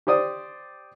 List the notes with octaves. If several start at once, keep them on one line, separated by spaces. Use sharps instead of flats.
G4 C5 D5 D#6